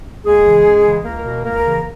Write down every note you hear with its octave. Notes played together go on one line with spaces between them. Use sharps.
D#2 G#3 G#4
C#3 E3
F#2
C#3 E3
C#2 A#3 A#4
B2
C#2 A#3 A#4
C#3 E3